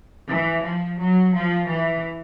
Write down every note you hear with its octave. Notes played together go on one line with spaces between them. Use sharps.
E3
F3
F#3
F3
E3